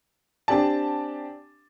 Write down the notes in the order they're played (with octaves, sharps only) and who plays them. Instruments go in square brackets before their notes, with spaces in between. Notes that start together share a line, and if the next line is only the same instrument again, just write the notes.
[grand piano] C4 D4 G4 D5 G#5 A5